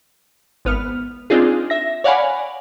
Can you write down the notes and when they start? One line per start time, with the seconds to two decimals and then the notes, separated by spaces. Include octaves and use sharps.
0.65 G#1 B3 F6
1.30 C4 D4 D#4 F4 G#4
1.70 E5 A#6
2.04 C#5 D5 F5 F#5 G#5 B5